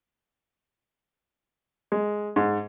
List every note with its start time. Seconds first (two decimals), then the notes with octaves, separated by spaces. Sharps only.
1.92 G#3
2.36 G#2